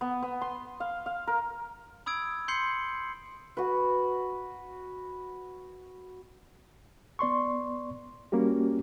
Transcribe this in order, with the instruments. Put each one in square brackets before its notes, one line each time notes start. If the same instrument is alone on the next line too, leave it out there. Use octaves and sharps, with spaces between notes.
[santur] B3
B3
C6
F5
F5
A#4
[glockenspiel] B5 D#6 E6 G#6 D7
C6 G6 C7 C#7 F#7
[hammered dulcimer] F#4 B4
[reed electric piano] B3 D5 C6 C#6
G3 A#3 C#4 F#4 G4